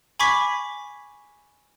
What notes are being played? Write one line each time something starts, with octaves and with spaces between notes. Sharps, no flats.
G#5 B5 C#6 D6 G#6 B6